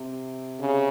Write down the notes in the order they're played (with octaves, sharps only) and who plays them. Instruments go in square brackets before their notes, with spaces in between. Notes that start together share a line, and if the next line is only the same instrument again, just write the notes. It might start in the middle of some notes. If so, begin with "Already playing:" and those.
Already playing: [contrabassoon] C3
[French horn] C#3